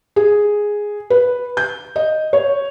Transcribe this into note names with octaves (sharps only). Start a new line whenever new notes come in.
G#4
B4
G6
D#5
C#5